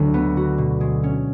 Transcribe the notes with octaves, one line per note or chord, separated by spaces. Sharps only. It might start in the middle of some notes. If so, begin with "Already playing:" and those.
Already playing: D2 D3 F#3
B3
F#4
B2
G#3
C#4